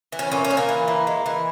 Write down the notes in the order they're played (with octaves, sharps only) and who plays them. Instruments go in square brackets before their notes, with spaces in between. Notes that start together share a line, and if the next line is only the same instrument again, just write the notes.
[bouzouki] E3
C#4
A#2 C#4
C#4
A#2
A#3
E3
E3
G#3
E3